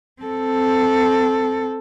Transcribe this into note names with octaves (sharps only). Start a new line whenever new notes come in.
C4 A4